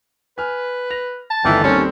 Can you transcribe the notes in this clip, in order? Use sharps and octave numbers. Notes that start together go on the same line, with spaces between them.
B4 G#5 F6
A#6 F7
A5
G1 D#3 E3 A3 E4
D#2 G3 C4 C#4 A4